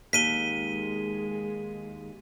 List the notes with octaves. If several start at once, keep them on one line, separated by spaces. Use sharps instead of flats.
D#2 G#3 B6 D#7 G7